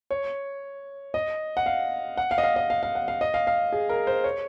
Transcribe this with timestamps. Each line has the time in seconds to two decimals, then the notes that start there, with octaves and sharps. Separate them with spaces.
0.11 C#5
1.14 D#5
1.57 F#5
1.66 F5
2.17 F#5
2.31 F5
2.38 D#5
2.43 F5
2.56 D#5
2.70 F5
2.83 F5
2.95 F#5
3.08 F5
3.21 D#5
3.34 F5
3.47 F5
3.72 G#4
3.90 A#4
4.07 C5
4.24 C#5